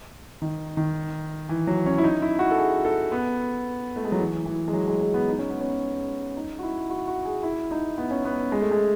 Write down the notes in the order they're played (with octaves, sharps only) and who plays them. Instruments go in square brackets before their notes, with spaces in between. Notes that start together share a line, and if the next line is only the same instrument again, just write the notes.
[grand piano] D#3
D#3
E3
F#3
C#4
E4
D#4
E4
F#4
A4
G#4
A4
B3
A3
G#3
F#3
E3
E3
G#3
F#3
G#3
G#3
B3
D#4
C#4
B3
C#4
D#4
F#4
E4
F#4
F#4
G#4
E4
D#4
B3
C#4
B3
G#3
A3
G#3